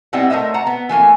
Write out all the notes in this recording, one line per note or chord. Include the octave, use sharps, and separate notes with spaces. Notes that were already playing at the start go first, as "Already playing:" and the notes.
G3 B3 C4 D#4 E4 F#5
A3 A#4 C5 D#5 E5
F#5 A5 A#5
B3
E3 A3 A#3 G#5